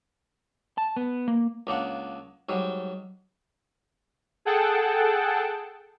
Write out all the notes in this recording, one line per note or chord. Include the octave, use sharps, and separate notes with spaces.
A5
B3
A#3
C#2 A#3 D4 F#5
G#2 F#3 G3
G#4 A4 F#5 G5 A5